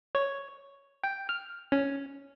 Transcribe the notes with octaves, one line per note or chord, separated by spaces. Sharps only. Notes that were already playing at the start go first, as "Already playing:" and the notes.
C#5
G5
F6
C#4